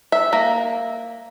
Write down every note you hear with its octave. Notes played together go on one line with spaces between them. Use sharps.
E5
A#3